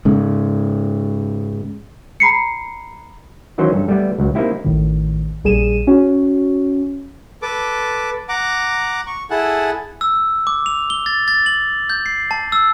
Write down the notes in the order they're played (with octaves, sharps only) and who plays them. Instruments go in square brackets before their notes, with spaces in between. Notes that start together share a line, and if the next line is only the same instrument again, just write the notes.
[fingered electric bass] G#2 C#3
[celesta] A#5 B5 C7 C#7
[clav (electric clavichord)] D#3 E3 F#3 C#4 D#4 C5
G2 A4
G3 A3 B3 D5
C#2 F#3
A#3 C4 D#4 E4 G4
[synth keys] A1 A2 D#3
A#1 G3 G#4 D#7 E7
C#4 F#4
[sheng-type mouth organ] A4 B4 D6
F#5 A#5 D6
C#6
E4 G#4 A4 F#5
[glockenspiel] E6
D6
F7
G7
A6
A6
F#7
G6
C7
A5
E6